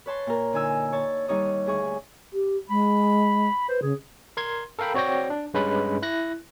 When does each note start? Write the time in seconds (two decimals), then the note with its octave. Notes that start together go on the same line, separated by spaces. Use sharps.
0.06 B4 C#5 A5 C6
0.27 A#2 A#4
0.53 D3 D#4 G#5 E6
0.92 C#5 A5
1.28 D#2 G3 D#4 C#5 D#6
1.66 D2 G#4 C#6
2.33 G4
2.70 G#3 B5
3.69 B4 C5
3.82 C#3 G#4
4.37 A#4 C6 G#6
4.79 A4 A#4 F5 G5 B5
4.94 C4 F#4 C#5 D5 G5 A#6
5.30 D4
5.54 G2 G#3 C#4 B4 B5
6.02 E4 F#6 A#6